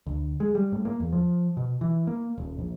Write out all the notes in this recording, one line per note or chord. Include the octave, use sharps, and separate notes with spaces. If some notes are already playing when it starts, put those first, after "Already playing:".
D2
G#3
G3
A2
A#3
E2
F3
B2
E3
A#3
D#1
A#1